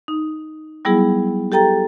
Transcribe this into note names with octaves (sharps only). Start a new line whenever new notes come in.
D#4
F#3 G3 B3 E4 G#4
G4 A4 G5 A#5 A6